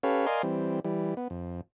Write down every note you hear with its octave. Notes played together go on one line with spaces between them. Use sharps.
C#4 G4 A4 B4 C#5 F5
A#4 D5 D#5 F5 G#5 C6
E3 G3 C4
E3 G3
B3
F2